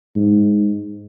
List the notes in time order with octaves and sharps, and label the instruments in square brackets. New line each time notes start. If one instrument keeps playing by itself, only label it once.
[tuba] G#2